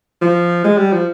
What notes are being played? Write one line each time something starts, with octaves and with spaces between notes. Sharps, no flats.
F3
G#3
G3
F3